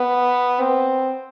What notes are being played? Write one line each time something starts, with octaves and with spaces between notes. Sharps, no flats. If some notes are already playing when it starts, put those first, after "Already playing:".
Already playing: B3
C4